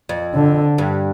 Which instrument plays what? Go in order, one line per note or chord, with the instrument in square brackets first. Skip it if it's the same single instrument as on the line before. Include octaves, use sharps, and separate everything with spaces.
[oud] F2
[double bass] D3
[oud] G2